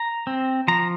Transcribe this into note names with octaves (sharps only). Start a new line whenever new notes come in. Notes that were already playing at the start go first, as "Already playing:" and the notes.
Already playing: A#5
C4
F3 A#5